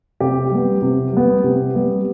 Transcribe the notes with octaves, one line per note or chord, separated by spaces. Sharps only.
C3 G4
G3 B3
C3
G3 B3
C3
G3 B3